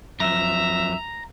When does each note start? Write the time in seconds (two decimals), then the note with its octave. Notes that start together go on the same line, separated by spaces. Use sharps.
0.20 F#2 F3 E5 A#5